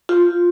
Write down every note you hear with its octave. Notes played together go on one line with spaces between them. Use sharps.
F4